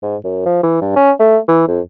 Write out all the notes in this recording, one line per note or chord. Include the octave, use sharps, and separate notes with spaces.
G#2
F#2
F3
E3
G2
C#4
A3
E3
F2